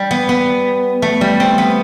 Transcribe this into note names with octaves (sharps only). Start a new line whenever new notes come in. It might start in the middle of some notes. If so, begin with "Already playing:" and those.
Already playing: G3
B3
B3
A3
G3
C4
B3